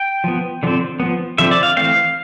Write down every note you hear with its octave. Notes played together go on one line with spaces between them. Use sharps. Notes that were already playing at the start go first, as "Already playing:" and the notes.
Already playing: G5
F3 B3
D3 F3 C4
F3 B3
D3 F3 C4 E5
D5
F5
E3 A3 C4 F5